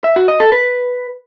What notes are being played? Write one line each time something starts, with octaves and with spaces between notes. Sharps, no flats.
E5
F#4
D#5
A4
B4